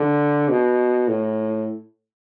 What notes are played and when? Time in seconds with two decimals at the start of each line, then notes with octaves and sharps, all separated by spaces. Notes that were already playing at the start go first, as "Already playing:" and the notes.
Already playing: D3
0.50 B2
1.08 A2